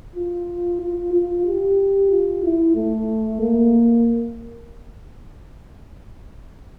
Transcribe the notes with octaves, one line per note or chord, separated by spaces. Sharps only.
F4
F4
F4
G4
F4
E4
A3
A#3